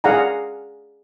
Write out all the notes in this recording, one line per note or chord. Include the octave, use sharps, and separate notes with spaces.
G#4 D5 F5 F#5 G#5 A#5